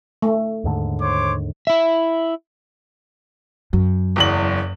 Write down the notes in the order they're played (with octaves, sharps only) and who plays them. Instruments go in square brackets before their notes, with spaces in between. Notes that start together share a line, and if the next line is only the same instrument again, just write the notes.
[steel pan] A3
[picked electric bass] D#2 G#2 D3
[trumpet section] C5 C#5 D6
[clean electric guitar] E4 E5
[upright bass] F#2 [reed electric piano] F#3
[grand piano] F#1 E2 F#7